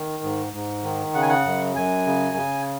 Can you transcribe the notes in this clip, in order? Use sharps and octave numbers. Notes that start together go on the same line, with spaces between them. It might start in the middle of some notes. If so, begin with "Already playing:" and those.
Already playing: D#3
G#2
G#2
D#3
C#3 F#5
G#5
F#5
F#2
F#2 G#5
C#3
C#3